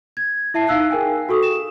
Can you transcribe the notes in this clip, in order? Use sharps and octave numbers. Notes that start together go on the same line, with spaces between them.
G#6
E4 E5 A5 C7
D#4 F5 E6 F#6 C7
G#4 A#4 G5 G#5
F#4 A4 C#6 D#6
E7